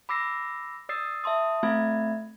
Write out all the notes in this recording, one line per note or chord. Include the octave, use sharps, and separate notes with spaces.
B5 D6 E6 A#6 C7
D5 D#6 E6 A6 C7
E5 A5 C6 D#6
A3 C4 F4 E5 B5 G#6